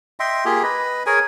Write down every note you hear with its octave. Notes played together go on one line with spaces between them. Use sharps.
D#5 E5 G5 C6
A#3 F4 G4 G#4
B4 D#5
G#4 A#4 C#5 G#5